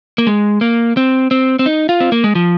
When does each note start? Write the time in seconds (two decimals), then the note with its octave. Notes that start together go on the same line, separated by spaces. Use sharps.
0.18 A#3
0.27 G#3
0.61 A#3
0.97 C4
1.31 C4
1.59 C4
1.66 D#4
1.89 F4
2.00 C4
2.12 A#3
2.24 G#3
2.35 F3